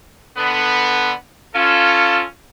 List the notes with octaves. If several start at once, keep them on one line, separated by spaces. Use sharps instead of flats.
D3 B3
C#4 F4 A4